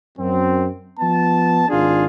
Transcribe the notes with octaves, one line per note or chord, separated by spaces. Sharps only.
F#2 C4
F3 B3 A5
G#1 D4 F4 G#4